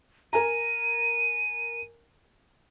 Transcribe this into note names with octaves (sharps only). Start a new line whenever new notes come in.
A#4 G#5 A#5 D#7